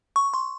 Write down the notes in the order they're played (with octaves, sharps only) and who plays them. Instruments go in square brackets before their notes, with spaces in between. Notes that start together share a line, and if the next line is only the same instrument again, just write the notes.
[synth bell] C#6
C6